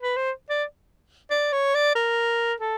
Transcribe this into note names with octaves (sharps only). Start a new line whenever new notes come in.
B4
C5
D5
D5
C#5
D5
A#4
A4